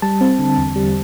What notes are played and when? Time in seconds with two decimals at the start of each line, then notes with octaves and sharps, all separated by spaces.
0.02 G3 A5
0.21 C4
0.39 D3
0.58 E2
0.76 G3